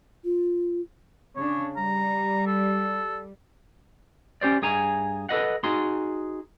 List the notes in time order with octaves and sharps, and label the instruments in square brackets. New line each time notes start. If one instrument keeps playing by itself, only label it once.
[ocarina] F4
[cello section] C#3 D4 [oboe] C#5
[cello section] G3 [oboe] A#5
[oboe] A4
[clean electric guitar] C#4 G4 C5 D5
G2 G#4 G#5 A#5
A4 B4 D#5 F#5
D#4 F#4 G#4 C6